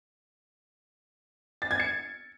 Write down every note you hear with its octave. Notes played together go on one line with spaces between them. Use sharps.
A6
G#6
C#7